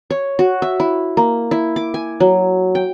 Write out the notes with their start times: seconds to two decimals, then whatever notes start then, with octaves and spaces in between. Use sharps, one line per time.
0.10 C#5
0.39 F#4
0.62 E5
0.80 E4
1.17 A#3
1.51 E4
1.76 D6
1.94 G#5
2.20 F#3
2.75 G5